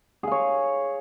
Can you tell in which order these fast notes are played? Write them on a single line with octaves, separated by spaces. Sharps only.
G#4 F5 C#5